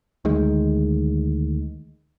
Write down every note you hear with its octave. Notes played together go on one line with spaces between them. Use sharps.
D2 D#3 G#3